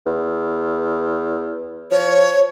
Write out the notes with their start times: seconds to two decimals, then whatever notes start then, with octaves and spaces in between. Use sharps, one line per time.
0.06 E2
1.91 F3 C#5